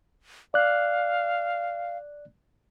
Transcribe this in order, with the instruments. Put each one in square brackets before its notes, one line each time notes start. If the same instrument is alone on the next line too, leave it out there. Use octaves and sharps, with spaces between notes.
[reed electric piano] D5 F#6 [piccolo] F5